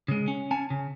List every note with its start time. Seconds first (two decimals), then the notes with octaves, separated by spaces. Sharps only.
0.08 C#3 G#3
0.28 C#4
0.51 C#4 G#5 A5
0.70 C#3